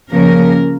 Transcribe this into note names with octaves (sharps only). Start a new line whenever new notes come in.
C#3 F3 A#3 C#4 A#4